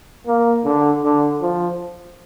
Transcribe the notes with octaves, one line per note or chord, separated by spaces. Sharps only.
A#3
D3
D3
F3